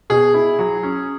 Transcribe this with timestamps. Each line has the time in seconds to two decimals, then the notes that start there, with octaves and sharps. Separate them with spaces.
0.10 B2 G#4
0.34 E4
0.59 F#3
0.83 C#4